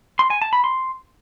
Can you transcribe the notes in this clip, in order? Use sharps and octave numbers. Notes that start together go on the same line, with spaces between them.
C6
G#5
A5
B5
C6